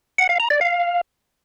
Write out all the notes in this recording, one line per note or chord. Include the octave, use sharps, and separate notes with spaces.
F#5
F5
A#5
D5
F5